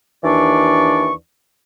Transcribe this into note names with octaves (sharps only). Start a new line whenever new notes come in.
D#2 E3 D4 D5 C#6